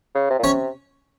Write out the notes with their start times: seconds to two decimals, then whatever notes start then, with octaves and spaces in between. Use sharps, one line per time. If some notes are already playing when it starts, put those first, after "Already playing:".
0.15 C#3
0.30 C3
0.39 A#2
0.44 C3 C#4 C#5